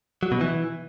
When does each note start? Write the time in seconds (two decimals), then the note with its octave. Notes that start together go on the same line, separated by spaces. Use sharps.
0.23 F#3
0.32 B2
0.41 E3